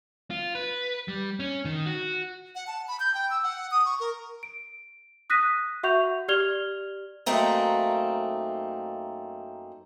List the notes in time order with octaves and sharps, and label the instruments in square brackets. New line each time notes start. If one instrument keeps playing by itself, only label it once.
[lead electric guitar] F4
B4
G3
C#4
D#3
F#4
[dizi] F#5
A5
B5
G6
G5
E6
F#5
D#6
C#6
A#4
[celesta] D7
D#6 F#6 A#6 B6 D#7
F#4 E5 F#5 C#6 G6 F7
G4 D5 F6 G#6 F7 G7
[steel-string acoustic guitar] F#2 A3 A#3 C4 D#4